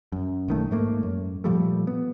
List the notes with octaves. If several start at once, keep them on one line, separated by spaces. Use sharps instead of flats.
F#2
B1 D#3 A3
G#2 A3 A#3
F#2
A#2 F3 G3 A3
B3